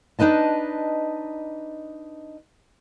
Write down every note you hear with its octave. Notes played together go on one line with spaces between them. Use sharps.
D4 D#4 B4 D#5 A5